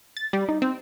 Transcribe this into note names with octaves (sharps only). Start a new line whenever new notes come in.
A6
G3
D#4
C4